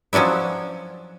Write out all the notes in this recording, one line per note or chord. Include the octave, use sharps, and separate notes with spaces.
F3 F#3 C#4 D4 E4